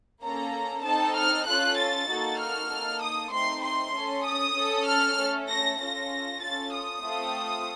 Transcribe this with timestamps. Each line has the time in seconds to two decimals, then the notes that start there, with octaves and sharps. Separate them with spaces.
0.23 A#3 C#4 A4 A#5
0.85 C4 D#4 A4 A5
1.16 F6
1.46 C#4 F4 A4 F#6
1.78 A6
2.09 A#3 D#4 F#4 A4
2.39 F6
2.70 A#3 D#4 A4
3.02 D#6
3.32 A3 C4 D#4 C6
3.63 C6
3.94 C#4 A4
4.25 D#6
4.56 C#4 A4
4.86 F6
5.18 A3 C#4 A4
5.48 A#6
5.79 C#4 F4 A4 A#6
6.41 C#4 F4 A4 A6
6.72 D#6
7.04 A3 C4 F4 A4